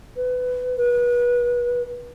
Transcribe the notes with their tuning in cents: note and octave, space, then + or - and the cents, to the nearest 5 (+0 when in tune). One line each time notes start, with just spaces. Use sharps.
B4 +20
B4 -30